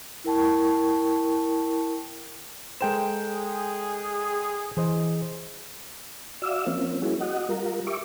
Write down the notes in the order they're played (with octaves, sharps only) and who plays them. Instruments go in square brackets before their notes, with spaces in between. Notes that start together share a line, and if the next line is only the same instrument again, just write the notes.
[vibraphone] E4 A#4 G5 A5 C#6
[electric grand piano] G#3 G5 E7 [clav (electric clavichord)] A4 A#4 C5
[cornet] G#4
[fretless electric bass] E3 [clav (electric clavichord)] G#4 C5 D#5
[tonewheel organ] F#4 D5 E5 F5 E6
F3 A#3 C4 C#4
G3 A#3 C#4 E4 F#4 G#4
F#4 D#5 F#5
G3 F4 A#4
G4 E5 C#6 D6